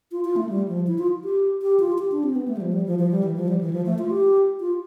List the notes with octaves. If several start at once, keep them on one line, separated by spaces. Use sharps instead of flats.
F4
F4
A3
G3
F3
E4
F4
G4
G4
F4
G4
D4
C4
B3
A3
G3
F3
G3
F3
F3
G3
E3
F3
G3
E3
F3
A3
F4
G4
F4